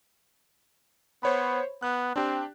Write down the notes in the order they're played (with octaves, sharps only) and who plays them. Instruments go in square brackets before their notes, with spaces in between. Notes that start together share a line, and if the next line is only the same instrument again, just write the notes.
[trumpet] B3 [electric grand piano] C5 C#5 B5
[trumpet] B3 [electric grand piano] F#6
[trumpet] C4 [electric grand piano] D4 G4 G5